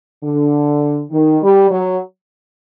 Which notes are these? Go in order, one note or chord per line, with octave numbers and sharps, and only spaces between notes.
D3
D#3
G3
F#3